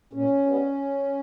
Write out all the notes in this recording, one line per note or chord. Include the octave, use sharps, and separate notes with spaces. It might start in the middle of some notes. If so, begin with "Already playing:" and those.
A#2 C#4
G3 B3